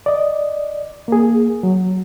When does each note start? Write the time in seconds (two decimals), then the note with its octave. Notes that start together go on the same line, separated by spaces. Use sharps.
0.06 D5 D#5
1.08 A#3 G#4
1.63 F#3